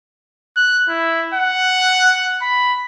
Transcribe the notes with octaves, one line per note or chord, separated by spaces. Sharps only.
F#6
E4
F#5
B5